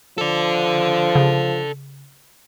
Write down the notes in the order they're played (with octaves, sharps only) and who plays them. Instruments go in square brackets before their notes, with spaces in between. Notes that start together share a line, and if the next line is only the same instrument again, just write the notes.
[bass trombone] F3 [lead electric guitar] A4 D5
[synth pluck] C#3